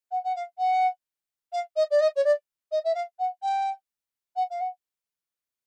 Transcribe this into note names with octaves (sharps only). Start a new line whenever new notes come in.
F#5
F#5
F5
F#5
F5
D#5
D5
D#5
C#5
D5
D#5
E5
F5
F#5
G5
F#5
F5
F#5